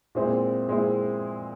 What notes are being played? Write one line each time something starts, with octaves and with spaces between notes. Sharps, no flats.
A#2 G#3 C4 E4
A#2 G#3 C4 E4